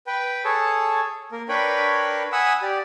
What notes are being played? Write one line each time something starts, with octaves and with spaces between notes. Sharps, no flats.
B4 G5
G#4 A4 C#5 A5
A#3 A#4
D4 A#4 B4 C#5 G5 B5
F#5 G#5 B5 D#6 E6
G4 D5